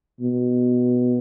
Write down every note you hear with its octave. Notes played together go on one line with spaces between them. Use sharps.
B2